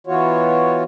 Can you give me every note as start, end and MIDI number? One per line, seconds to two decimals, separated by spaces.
0.07 0.84 52
0.07 0.84 59
0.07 0.84 65
0.07 0.84 66
0.07 0.84 73